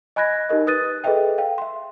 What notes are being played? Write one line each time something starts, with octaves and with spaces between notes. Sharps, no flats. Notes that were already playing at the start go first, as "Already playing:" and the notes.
D#5 G#5 B5 F#6 G#6 A#6
D#4 G4 A#4 D#5
B4 D#6 F#6 A6 D#7
G#4 A4 B4 D#5 E5 G5
F5 G5
E5 C6